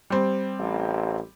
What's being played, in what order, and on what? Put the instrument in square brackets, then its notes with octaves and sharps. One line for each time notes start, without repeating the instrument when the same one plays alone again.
[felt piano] G3 C4
[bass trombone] A1